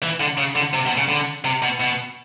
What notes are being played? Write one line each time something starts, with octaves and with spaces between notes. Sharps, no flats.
E3
D3
C#3
D3
C3
B2
C#3
D3
C3
B2
B2